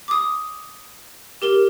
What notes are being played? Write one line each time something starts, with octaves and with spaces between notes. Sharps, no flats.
D6 D#6
G4 A#4 G7